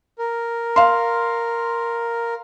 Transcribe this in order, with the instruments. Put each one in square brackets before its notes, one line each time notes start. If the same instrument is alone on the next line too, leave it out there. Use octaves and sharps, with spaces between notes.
[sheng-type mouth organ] A#4
[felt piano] F5 C6